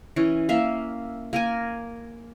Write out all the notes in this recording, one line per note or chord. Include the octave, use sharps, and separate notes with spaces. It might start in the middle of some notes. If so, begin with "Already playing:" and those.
E3 C#4
A#3 E5 F5
A#3 A#4 G#5